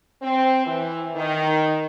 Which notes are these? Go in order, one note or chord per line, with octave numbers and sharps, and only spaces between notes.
C4
E3
D#3